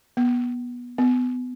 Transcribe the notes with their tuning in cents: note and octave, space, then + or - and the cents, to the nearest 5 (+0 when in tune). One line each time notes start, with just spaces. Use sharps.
B3 -20
B3 +25